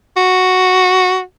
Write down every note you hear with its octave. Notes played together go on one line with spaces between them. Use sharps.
F#4